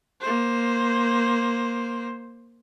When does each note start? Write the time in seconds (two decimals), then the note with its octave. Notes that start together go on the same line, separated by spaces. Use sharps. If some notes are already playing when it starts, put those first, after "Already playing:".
0.21 A#3 C5